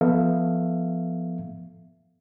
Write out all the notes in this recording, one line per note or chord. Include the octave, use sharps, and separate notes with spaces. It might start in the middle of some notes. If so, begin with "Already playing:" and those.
F3 B3 A4 E5 F5